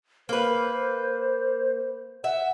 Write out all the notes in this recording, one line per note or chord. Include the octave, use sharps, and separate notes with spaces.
A#3 B4 C5
E5 F#5